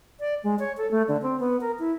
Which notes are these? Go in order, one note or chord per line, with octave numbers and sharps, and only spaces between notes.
D5
G#3
C#5
A4
A3
D3
C4
B3
A#4
E4